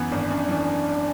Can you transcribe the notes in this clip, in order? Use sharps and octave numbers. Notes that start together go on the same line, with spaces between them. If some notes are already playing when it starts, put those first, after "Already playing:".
Already playing: F#2 E3 B3
G#1 D4
F#2
E3